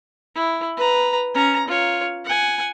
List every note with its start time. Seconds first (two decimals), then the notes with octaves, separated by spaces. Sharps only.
0.35 E4
0.77 B4 A#5
1.35 C#4 A#5
1.68 F4 C#5
2.25 F#5 G#5